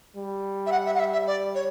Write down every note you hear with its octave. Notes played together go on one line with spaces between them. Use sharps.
G3
E5
F#5
E5
F#5
E5
E5
D5
C#5